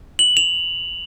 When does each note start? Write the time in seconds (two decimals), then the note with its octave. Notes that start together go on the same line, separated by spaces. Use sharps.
0.19 F#7
0.37 F7